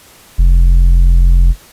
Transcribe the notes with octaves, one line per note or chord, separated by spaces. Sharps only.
F1